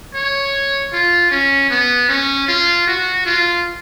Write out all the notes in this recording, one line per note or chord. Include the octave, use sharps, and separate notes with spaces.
C#5
F4
C#4
B3
C#4
F4
F#4
F4